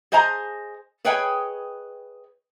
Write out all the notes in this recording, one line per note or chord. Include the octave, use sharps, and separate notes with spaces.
G#4 C5 D#5 G#5 A#5
G#4 B4 C#5 D#5 G5 G#5